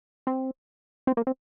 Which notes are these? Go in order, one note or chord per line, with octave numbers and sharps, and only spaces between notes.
C4
C4
A#3
C4